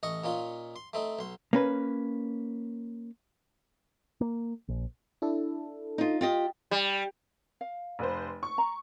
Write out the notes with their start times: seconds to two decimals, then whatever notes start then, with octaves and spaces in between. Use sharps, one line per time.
0.03 A1 D#5 C#6
0.24 A#2 C#4 D#4 F4
0.76 C6
0.93 A3 C4 D#4
1.19 B1 C6
1.53 A#3 C#4 B4
4.21 A#3
4.68 A#1
5.22 D4 E4 A4
5.98 D#4 F4
6.21 F4 G4 D#5
6.71 G3
7.61 F5
7.99 F1 B4 C5
8.43 C#6
8.58 A#5